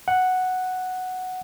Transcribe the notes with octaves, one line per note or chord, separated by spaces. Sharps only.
F#5